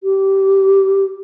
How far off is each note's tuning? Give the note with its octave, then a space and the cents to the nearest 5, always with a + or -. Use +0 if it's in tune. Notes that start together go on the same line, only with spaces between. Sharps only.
G4 -15